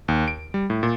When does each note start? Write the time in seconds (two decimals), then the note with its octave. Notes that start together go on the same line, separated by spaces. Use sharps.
0.08 D#2
0.28 D7
0.54 G3
0.70 A2
0.83 A#2